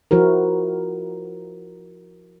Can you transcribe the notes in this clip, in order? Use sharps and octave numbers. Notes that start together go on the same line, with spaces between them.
F3 E4 F#4 A#4